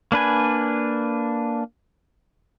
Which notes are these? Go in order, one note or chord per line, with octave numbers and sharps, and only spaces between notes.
A#3 D4 B4 G#5